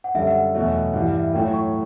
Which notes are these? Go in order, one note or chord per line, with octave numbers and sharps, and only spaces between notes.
F#5
F#2 D3 G3 D4 A4 E5
F#5
E2 B2 F#3 A3 E5
G2 E3 G3 F#5
E5
A2 F#3 A3 G5
C#6